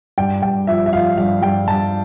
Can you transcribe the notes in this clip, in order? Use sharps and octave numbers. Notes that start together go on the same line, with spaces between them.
G2 G5
G2 G5
F3 E5
E5
F3 F5
G2 F5
G2 G5
G2 A5